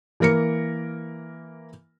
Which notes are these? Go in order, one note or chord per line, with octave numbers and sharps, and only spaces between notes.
E3 A#3 A#4 A#6 C#7